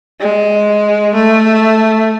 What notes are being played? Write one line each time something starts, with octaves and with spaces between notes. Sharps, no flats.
G#3
A3